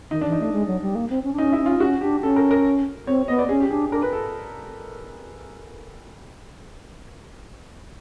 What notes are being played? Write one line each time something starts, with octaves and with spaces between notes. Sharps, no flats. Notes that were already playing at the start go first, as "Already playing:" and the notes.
D#3 D#4
D4
E3
D#4
A3 D4
G#3
F#3
G3
A#3
C4
C#4
D4
C#4 D#4
E4
C#4
F4
C#4 F#4
D4 G4
C#4 A4
A#4
A#4
C4 C#5
B3 D#5
D5
C#4 G#4
G4
D4 G#4
D4 A#4
B4
A4